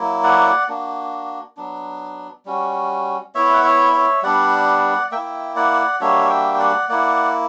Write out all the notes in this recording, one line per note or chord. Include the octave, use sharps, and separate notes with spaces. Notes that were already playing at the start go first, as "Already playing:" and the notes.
Already playing: F#3 A#3 E4
D5 F#5
A#3 D4 F#4
F#3 B3 D4
G3 C#4 F#4
B3 E4 C#5 E5
F#5
C#5 E5
C#5 E5
G3 B3 D4 D5 F#5
A#3 E4 E5 G5
D5 F#5
G3 A#3 D4 F#4 C#5 E5
E5 G5
G5
D5 F#5
A#3 E4 D5 F#5